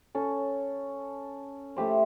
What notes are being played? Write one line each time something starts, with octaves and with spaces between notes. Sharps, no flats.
C#4 A4
A3 E4 G4 C5